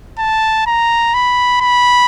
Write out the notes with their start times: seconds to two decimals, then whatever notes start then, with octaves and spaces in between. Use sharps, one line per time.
0.19 A5
0.67 A#5
1.14 B5
1.61 B5